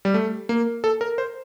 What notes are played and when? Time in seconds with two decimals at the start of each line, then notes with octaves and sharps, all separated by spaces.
0.05 G3
0.14 A3
0.49 A#3
0.84 A4
1.01 A#4
1.18 C5